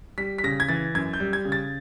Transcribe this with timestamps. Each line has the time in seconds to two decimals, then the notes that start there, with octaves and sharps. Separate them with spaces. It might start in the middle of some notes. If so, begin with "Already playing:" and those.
0.18 G3 B6
0.38 B6
0.44 C#3 A#6
0.60 G#6
0.69 E3 A6
0.95 F#2 G#6
1.14 G6
1.20 G3
1.33 G#6
1.45 C#3
1.52 A6